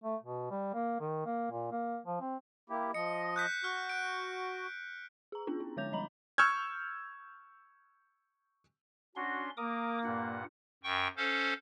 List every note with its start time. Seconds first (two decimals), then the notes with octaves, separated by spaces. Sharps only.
0.04 A3
0.23 B2
0.51 G3
0.74 A#3
1.00 D#3
1.26 A#3
1.51 A#2
1.72 A#3
2.05 F3
2.21 C4
2.70 A#3 E4 G4
2.94 F3 D#5 C#7
3.36 F#6 G6 B6
3.64 F#4 F6
3.89 F#6 D7
5.32 G#4 A#5
5.47 B3 C#4 D4 F4
5.60 E4
5.77 D3 G#3 C#5 D6 G6 F7
5.92 F3 G3 D#5 A#5 B5 F#7
6.38 C#6 E6 F6 G6 G#6
9.16 C#4 D4 F#4 C6
9.57 A#3 A#4 D6 D#6
10.04 G2 A#2 F#5
10.83 F#2 G5 C#6
11.17 C#4 A4 C5 F5